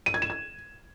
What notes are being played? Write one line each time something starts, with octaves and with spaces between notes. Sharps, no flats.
D#7
G#6
E7
G#6